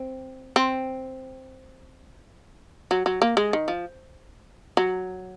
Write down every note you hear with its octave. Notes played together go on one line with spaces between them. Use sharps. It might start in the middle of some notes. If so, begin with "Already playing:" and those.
Already playing: C4
C4
F#3
F#3
A#3
G#3
D#3
F3
F#3